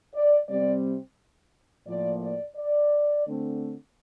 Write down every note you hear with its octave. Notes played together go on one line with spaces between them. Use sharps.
D5
C3 G3 C4 D5
A2 F3 A#3 D5
D5
D5
D3 A3 C4